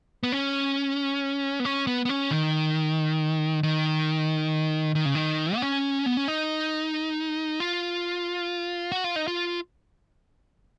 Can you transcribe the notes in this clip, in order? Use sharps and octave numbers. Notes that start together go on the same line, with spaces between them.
B3
C#4
B3
C#4
B3
B3
C#4
D#3
D#3
D#3
C#3
D#3
B3
C#4
B3
C#4
D#4
F4
F#4
F4
D#4
F4